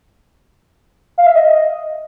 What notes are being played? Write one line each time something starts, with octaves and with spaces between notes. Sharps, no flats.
F5
E5
D#5